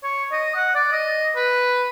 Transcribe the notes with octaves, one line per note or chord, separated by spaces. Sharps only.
C#5
D#5
F#5
D5
D#5
B4